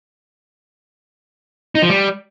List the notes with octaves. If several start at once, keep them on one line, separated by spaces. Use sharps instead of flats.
D#4
F3
G3